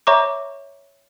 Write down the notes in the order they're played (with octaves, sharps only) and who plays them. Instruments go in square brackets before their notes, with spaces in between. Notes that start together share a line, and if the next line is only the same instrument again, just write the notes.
[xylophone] C#5 E5 A#5 C#6 D6